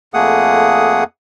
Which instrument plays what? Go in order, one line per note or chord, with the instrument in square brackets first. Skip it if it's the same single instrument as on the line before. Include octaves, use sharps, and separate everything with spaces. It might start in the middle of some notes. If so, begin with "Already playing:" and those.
[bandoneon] F2 A3 A#3 G#4 F#5 D#6